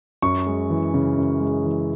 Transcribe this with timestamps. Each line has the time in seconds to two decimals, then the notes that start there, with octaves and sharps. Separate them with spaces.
0.22 F#2 C#6
0.47 G#3
0.70 E3
0.94 C#3
1.17 F#2
1.41 G#3
1.65 E3